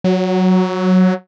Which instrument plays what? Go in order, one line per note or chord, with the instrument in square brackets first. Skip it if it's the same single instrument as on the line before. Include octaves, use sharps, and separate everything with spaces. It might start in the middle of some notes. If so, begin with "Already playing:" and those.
[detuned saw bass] F#3